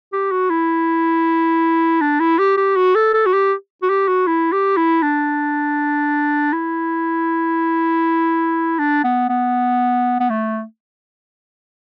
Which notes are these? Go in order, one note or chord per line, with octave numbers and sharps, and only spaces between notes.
G4
F#4
E4
D4
E4
G4
G4
F#4
A4
A4
F#4
G4
F#4
G4
F#4
E4
G4
E4
D4
E4
D4
B3
B3
B3
A3